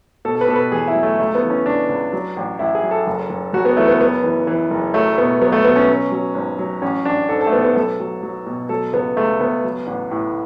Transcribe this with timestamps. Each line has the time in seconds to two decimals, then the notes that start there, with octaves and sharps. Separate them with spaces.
0.25 B2 A4
0.35 A4
0.41 B4
0.48 B2 A4
0.56 B4
0.72 E2 G#4
0.88 E4
0.95 F#3
1.03 A3
1.19 C#2 A3
1.35 B3
1.43 E3
1.50 C#4
1.66 C#2 D4
1.89 C#2
2.13 F#3
2.37 A1
2.59 A1 E4
2.75 G#4
2.83 F#3
2.91 A4
3.07 F#1
3.30 F#1
3.53 F#1 F#4
3.65 B3
3.77 E3 A3
3.88 B3
4.00 F#1 B3
4.23 E3
4.47 E3
4.71 F#1
4.94 F#3 A3
5.18 B2 B3
5.41 F#3 B3
5.52 A3
5.64 B2 B3
5.76 C#4
5.88 F#3
6.12 F#3
6.35 G#1
6.59 F#3
6.82 A1 C#4
7.05 A1 D4
7.29 G#2 A4
7.41 A4
7.47 A3
7.52 A1 B3
7.65 B3
7.76 B1 A4
8.00 F#3
8.23 F#3
8.46 B2
8.69 F#3 A4
8.93 C#2 B3
9.17 C#2 A3
9.40 C#2 B3
9.64 F#3
9.87 A1
10.11 A2